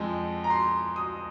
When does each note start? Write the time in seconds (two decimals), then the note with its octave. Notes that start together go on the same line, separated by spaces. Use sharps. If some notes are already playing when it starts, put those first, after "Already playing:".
Already playing: F2 F3 G#3
0.44 A#5
0.50 C6
0.96 D#6